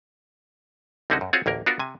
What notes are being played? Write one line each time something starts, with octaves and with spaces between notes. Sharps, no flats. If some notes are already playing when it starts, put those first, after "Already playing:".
C2 D3 C4 C#4 D#4 F#4
F#2
C4 F4 F#4 G#4 C#5
A1 D2 A#3 A#4
B3 D4 F4 F#4 A#4
C3 G#5